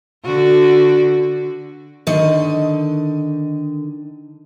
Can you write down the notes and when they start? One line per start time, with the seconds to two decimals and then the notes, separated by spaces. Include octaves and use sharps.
0.25 D3 F#4
2.07 D3 D#3 D#5